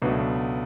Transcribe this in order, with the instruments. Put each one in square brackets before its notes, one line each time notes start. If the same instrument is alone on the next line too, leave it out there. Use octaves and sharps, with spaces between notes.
[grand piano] C#2 B2 F#3 A3 [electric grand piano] B3 D4